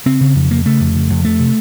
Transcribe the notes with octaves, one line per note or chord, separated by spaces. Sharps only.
C#3 C4
C#3
F2
C#3 A#3
C#3 A3
F2
C#3
F2
F2 A3
C3